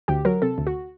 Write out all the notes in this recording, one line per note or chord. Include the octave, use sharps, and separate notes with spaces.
D2 G4
F#3 A#4
C3 A4
D2
F#4